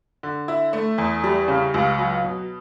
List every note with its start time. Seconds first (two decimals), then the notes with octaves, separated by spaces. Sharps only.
0.23 D3
0.48 E4
0.73 A3
0.98 E2
1.24 G3
1.48 C#3
1.74 C#2
1.98 F#3
2.24 B2